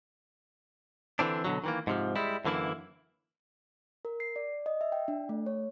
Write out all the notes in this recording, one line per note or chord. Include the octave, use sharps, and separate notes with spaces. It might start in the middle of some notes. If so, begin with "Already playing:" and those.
D3 E3 C4 D4
B2 D3 F#3
D#3 E3 A#3
G#2 C3 F3
G3 G#3 E4
F#2 D3 E3 A#3 E4
A#4
C7
D5
D#5
E5
G5
D4
A3
C#5